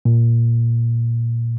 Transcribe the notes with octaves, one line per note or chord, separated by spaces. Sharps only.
A#2